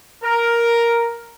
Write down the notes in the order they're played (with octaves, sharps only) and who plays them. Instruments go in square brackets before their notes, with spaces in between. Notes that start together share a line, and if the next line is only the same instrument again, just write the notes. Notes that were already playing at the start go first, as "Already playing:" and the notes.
[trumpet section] A#4